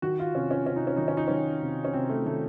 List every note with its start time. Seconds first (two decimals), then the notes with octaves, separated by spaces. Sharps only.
0.02 D#3 F#4
0.19 F4
0.34 C3 C#4
0.51 C#4
0.66 C3 C#4
0.76 D#4
0.87 C#4
0.97 D#3 D#4
1.08 C#4
1.17 D#4
1.28 D#3 C#4
1.62 C3
1.85 C#4
1.93 C3 C4
2.10 A3
2.26 D#3 A3